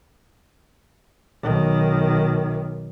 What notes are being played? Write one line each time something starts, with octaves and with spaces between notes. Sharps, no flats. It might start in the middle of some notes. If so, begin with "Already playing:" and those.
B1 D#3